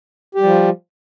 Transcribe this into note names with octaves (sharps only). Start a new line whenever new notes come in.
F3 G3 G4